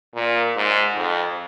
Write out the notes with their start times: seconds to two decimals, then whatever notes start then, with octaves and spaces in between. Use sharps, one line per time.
0.15 A#2
0.56 G#2
0.96 F2